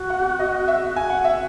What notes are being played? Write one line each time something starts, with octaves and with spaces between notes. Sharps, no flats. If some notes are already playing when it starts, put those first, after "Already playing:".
Already playing: F#4
F#5
D#5
E5
F#4 G#5
F#5
E5